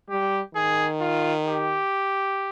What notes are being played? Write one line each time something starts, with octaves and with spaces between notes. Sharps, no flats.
G3 G4
D#3 G#4
F4
G4